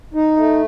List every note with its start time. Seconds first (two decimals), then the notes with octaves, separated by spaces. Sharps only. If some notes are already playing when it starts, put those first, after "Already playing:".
0.14 D#4
0.37 A3